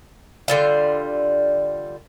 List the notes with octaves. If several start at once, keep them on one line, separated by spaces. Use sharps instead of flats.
D3 G3 F4